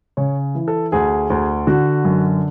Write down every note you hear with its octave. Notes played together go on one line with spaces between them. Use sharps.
C#3 C#5
E3
A4
D2 G#4
D2
D3 F#4
F#2